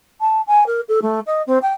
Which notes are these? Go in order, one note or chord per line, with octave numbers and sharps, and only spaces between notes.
A5
G#5
A#4
A4
A3
D#5
C4
G5